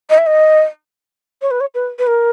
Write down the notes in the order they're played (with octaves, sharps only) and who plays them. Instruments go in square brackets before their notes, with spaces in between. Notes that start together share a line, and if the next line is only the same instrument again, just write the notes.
[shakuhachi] D#5
E5
D#5
C#5
B4
C#5
B4
B4
A#4